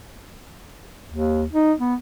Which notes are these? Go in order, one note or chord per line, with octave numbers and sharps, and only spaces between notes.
D#2
D#4
B3